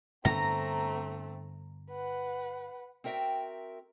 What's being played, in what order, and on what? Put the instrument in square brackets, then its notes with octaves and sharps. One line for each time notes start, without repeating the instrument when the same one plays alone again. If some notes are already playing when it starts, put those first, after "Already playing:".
[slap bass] G2 D3 B3 [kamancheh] A3 C4 [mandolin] A#5
[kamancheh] B4 F#5
[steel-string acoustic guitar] C4 F#4 A#4 E5 G5